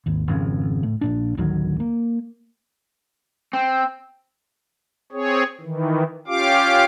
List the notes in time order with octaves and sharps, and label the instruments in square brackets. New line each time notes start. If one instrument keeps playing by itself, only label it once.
[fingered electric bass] G#1 D#2
G#1 F2 C#3
A2
A#1 A#2 D4
A1 D2 D#3 F#3
A#3
[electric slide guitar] C4
[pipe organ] C4 G#4 C#5
D#3 E3
C#4 F4 G4 F5 D6